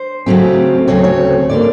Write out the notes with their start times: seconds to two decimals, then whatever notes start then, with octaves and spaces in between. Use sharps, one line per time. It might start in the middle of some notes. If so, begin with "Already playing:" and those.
Already playing: C5
0.26 C#3 F#3 A3 C4
0.87 D2 C#3 F#3 A3 C4 C#5
1.04 C#5
1.49 D3 G3 A#3 D5